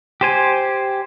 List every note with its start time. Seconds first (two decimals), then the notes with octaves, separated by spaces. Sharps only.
0.21 G4 C5 G#5